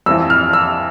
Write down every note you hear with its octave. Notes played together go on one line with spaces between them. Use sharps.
F2 E3 E6
F6
E6